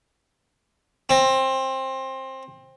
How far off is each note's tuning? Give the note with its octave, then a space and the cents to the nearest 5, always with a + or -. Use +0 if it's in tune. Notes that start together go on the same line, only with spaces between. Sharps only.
C4 +20